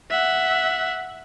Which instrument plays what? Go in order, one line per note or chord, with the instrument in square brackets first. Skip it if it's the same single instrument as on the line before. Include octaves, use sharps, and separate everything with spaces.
[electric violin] E5 F#5